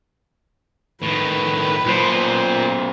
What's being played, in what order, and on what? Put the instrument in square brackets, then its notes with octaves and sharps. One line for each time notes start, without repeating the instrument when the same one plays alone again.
[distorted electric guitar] A2 D#3 [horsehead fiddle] B4
[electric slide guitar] F#2 C5 [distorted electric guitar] A#2